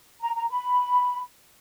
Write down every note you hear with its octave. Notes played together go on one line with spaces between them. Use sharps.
A#5
A#5
B5